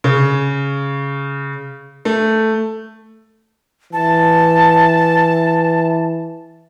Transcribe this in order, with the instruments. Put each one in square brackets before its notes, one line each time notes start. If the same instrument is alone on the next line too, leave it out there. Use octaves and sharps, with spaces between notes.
[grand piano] C#3
A3
[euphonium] E3 [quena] A5